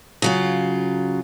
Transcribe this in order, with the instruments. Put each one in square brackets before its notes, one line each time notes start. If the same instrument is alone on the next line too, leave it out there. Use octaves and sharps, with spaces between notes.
[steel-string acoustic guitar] C#3 F#3 F4